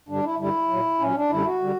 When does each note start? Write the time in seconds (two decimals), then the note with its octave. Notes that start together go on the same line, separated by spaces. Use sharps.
0.08 G2 D3 G3 D4
0.24 E4
0.39 G2 D3 G3 E4
0.69 A#2 F#3
0.99 A#2 F#3 C#4
1.15 D4
1.29 F#2 D3 G3 E4
1.44 F#4
1.61 D3 G3